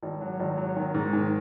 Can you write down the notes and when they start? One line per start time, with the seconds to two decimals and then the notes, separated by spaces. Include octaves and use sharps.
0.03 G#1
0.21 F#3
0.40 G#1
0.57 F#3
0.76 D#3
0.94 G#2
1.13 D#3